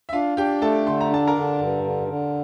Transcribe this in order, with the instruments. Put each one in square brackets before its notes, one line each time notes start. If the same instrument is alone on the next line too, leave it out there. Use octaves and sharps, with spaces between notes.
[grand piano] E5
[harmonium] D4 [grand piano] F4 F5
[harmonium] D4 [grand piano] G4 G5
[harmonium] A3 [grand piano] A4 A5
[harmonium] D3 [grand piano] C6
[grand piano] A#5
[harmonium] D4 [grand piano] A5
[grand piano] A#4 A#5
[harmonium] D3
G2
D3
D3